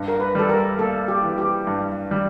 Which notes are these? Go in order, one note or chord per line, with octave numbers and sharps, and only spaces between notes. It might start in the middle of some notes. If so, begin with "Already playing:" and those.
Already playing: G2
A#4
B4
G3 A4
A#4
A#3 A4
G4
E3
G4
G2
G3